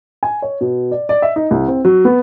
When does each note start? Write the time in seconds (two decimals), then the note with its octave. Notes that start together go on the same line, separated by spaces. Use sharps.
0.23 G#5
0.42 C#5
0.61 B2
0.91 D5
1.09 D5
1.22 E5
1.36 D#4
1.51 C2
1.68 C4
1.85 F#3
2.05 B3